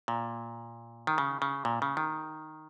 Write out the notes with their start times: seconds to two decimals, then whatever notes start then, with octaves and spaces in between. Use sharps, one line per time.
0.08 A#2
1.07 D#3
1.18 C#3
1.42 C#3
1.65 A#2
1.82 C#3
1.97 D#3